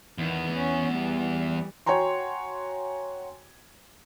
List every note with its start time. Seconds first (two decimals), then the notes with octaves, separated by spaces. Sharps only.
0.18 E2 D#3 B3
0.52 C#4
0.91 E3 G3
1.86 F#4 C#5 G5 G#5 A#5 C6